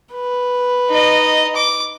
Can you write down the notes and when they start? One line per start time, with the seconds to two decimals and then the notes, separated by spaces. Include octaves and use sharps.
0.14 B4
0.89 D#4 D#5
1.56 D6